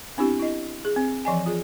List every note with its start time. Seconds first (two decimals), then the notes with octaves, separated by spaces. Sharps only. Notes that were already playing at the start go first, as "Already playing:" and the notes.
0.17 B3 C4 D4 E4 G4
0.40 E4 D#5
0.85 G#4
0.96 C4
1.25 E3 F3 D#5 G#5
1.46 F4 G#4